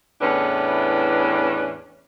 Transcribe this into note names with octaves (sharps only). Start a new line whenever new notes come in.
E2 A2 C#4 D4 B4